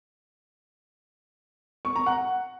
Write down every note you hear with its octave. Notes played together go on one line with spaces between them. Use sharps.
C#6
A#5
F#5